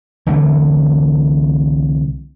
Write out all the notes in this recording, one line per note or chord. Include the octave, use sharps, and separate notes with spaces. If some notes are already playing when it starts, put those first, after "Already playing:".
C2 D3 E3 A3